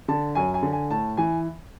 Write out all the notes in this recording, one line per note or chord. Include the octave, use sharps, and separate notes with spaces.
D3 A5
F#2 G#5
G#5
D3
G#5
A2 A5
E3 G#5